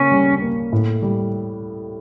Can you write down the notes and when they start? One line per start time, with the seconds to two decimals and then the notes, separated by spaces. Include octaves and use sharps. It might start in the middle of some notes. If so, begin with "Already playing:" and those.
Already playing: C#3 A#3 C#4
0.12 G3
0.42 A#3
0.72 A2
1.02 G3